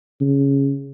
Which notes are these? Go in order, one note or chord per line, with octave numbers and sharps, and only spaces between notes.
C#3